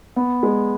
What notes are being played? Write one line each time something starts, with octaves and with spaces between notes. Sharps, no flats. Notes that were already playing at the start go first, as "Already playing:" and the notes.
B3
G#3